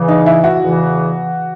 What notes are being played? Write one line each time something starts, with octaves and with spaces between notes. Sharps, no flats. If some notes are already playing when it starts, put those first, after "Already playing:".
Already playing: E2 C#3 E3
D#4
E4
F#4
E2 C#3 E3